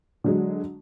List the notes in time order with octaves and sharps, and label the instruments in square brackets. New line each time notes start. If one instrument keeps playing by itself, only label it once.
[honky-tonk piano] D3 F#3 G#3